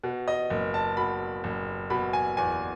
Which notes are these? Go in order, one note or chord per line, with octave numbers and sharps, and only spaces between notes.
B2
D#5
F#1
A5
B2 B5
F#1
B2 B5
G#5
E2 G#5